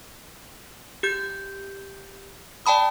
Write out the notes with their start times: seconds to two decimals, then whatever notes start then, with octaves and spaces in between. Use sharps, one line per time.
1.03 G4 G6
2.66 D5 G5 A5 B5 D#6